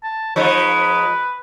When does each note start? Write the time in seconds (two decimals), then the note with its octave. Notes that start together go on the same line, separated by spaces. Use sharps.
0.03 A5
0.36 F3 G#3 D#4 B4